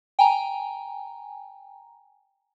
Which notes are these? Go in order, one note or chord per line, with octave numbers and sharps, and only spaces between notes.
G5 G#5 A#5